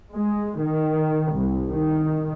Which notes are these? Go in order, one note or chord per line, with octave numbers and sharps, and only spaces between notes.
G#3
D#3
C2
D#3